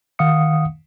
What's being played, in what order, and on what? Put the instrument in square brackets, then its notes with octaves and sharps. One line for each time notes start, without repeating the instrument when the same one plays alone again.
[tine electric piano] D#3 F5 F#5 D#6 C#7